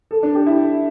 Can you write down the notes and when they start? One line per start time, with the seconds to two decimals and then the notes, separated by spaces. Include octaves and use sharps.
0.11 A4
0.23 D4
0.35 G4
0.46 E4